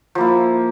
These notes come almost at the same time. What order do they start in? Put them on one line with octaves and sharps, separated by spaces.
F3 A#3 E4